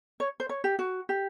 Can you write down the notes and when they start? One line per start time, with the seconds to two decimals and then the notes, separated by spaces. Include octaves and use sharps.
0.20 C#5
0.40 C5
0.49 C#5
0.64 G4
0.79 F#4
1.09 G4